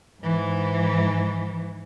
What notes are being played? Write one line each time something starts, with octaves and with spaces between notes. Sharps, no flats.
G#2 E3